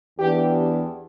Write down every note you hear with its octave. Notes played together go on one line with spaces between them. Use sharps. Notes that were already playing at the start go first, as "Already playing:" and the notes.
E2 E3 B3 D4 G4
G4